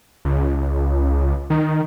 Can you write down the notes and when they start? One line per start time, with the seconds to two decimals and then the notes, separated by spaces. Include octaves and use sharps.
0.25 C#2
1.50 D#3